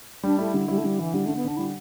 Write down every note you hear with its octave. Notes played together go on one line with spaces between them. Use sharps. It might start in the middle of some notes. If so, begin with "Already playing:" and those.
G3 D4
A3 E4
D3 G3
G3 E4
A3
D3 G3
E3 E4
D3 G3
D3 A3
B3
D3 D4
G3 E4